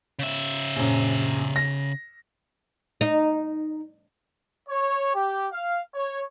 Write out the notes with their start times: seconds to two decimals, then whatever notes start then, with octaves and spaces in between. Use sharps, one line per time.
0.19 C#3 E5
0.76 A#1 F#2
1.56 A#6
3.01 D#4
4.69 C#5
5.15 G4
5.52 F5
5.95 C#5